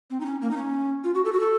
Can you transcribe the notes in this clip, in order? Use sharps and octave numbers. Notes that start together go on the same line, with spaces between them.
C4
D#4
C#4
A#3
D#4
C#4
F4
F#4
A4
F#4
A4